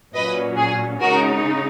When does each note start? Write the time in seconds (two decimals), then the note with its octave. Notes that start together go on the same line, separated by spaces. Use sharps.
0.14 A#2 F#3 C#4 B4 D#5
0.57 G#4
1.00 C#3 G#3 D#4 F#4 A#4